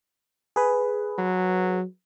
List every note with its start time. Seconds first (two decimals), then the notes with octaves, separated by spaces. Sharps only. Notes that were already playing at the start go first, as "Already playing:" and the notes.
0.56 G#4 B4
1.18 F#3